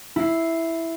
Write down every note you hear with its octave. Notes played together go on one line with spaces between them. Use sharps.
E4 C7